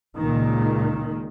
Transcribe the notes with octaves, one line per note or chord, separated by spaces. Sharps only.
C#2 A#2 D#3